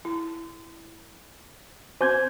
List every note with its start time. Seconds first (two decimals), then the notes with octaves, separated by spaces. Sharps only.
0.05 E4
2.01 C4 C#4 F#4 C5 G6 G#6